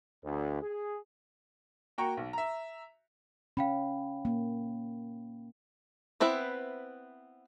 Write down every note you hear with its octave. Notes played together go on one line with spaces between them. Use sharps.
D2
G#4
A#3 F#4 G5 A#5 C#6
B1
E5 A#5
C#4 F5 G5 B5
A#3
B3 C4 E4 B4 E5